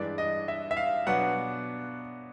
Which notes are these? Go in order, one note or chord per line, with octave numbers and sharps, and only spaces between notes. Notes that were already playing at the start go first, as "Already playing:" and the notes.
Already playing: G2 E3 G#3 D5
D#5
E5
E5
F5
B2 F#3 B3 D4 F#5